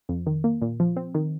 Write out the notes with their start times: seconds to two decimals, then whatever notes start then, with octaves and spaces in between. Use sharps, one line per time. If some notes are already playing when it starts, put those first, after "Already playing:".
0.09 F2
0.27 D#3
0.44 A#3
0.62 A#2
0.80 F3
0.97 C4
1.15 D#3